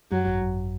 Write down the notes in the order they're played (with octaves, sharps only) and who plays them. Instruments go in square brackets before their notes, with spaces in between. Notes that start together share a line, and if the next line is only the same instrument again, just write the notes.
[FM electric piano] F#2 [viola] F#3
[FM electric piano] G#1
F#2